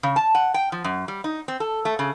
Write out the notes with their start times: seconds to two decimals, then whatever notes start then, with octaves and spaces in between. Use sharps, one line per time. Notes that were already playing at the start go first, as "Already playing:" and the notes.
0.03 C#3
0.16 A5
0.35 F#5
0.54 G5
0.72 F3
0.84 F#2
1.08 G3
1.24 D#4
1.48 C4
1.60 A4
1.85 A3
1.99 C#3